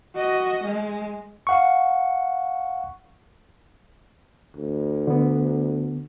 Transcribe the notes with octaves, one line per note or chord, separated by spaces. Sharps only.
F#4 D#5
G#3
F5 F#5 C#6
D2
D3 B3